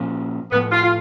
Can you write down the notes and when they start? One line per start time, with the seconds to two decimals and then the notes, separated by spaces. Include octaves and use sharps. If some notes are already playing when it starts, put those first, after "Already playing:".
Already playing: A#2 F3 A#3 C#4
0.51 A2 F3 A3 B3
0.72 F4
0.83 F4